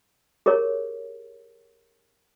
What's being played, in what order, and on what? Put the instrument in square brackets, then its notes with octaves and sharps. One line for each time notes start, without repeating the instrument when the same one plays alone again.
[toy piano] G4 G#4 A#4 C#5